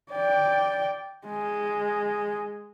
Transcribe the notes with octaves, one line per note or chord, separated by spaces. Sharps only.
D5 G5
G#3